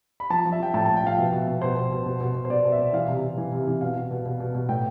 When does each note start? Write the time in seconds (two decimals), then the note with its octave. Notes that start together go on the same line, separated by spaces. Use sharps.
0.20 B5
0.30 F3 A5
0.45 F3
0.52 E5
0.60 F3 G5
0.74 A2 A5
0.86 A5
0.89 A2
0.97 G5
1.03 F3 F5
1.18 B2 E5
1.33 B2
1.47 B2
1.62 B2 C5
1.76 B2
1.91 B2
2.06 B2
2.21 B2
2.35 B2
2.45 C5
2.50 B2 D5
2.65 B2
2.72 E5
2.79 B2
2.93 E3 F5
3.08 C3
3.23 C3
3.38 E3
3.52 C3
3.67 E3
3.81 B2 F5
3.96 B2
4.11 B2
4.26 B2
4.40 B2
4.55 B2
4.69 A2 G5